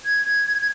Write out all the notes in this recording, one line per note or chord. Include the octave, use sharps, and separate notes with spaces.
G#6